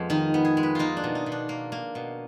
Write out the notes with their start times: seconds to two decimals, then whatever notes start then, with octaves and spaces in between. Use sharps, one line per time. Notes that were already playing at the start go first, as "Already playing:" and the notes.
Already playing: F2 G#3 B3
0.10 D#3 D#4
0.34 B3
0.45 G#4
0.57 G#3
0.63 B4
0.75 A#3 D#4 F4
0.97 D4
1.04 B2
1.15 D#4
1.26 B2
1.32 D4
1.49 A#3
1.72 A#3
1.95 B2